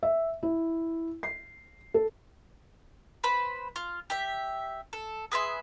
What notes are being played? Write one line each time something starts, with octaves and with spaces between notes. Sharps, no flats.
E5
E4
C7
A4
B4 C5 B5
F4
G4 E5
A4
G#4 B4 E5 C6